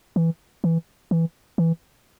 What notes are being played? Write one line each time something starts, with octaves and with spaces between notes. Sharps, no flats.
E3
E3
E3
E3